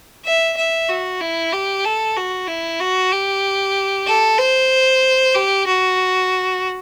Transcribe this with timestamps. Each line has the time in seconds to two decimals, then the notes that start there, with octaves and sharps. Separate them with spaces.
0.25 E5
0.57 E5
0.89 F#4
1.20 E4
1.53 G4
1.85 A4
2.16 F#4
2.47 E4
2.80 F#4
3.12 G4
4.07 A4
4.39 C5
5.35 G4
5.67 F#4